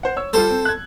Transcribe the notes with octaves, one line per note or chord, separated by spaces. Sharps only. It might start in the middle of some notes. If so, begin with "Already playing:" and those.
C5 F#5
C#5 E6
G3 F4 A4 C5
C4
F#6 G#6